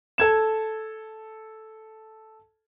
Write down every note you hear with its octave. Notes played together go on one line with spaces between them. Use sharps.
A4 G#6 E7